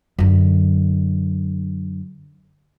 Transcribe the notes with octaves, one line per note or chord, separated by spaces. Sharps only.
F#2 D3